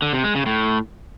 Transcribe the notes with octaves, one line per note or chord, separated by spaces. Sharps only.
D3
C3
G#3
C#3
A2